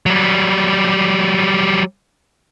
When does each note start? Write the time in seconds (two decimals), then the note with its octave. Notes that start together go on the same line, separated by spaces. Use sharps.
0.06 F#3 G3